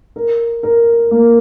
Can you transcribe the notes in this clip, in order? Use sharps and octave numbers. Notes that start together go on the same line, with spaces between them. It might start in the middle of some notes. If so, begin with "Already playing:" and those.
A#4
A#4
A#3